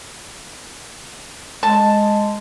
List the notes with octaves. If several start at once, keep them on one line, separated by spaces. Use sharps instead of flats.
G#3 A5